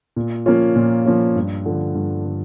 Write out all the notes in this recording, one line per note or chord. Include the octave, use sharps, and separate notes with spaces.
A#2
F3 A#3 C#4 F4
A#2
F3 A#3 C#4 F4
G2
D3 F3
G2
D3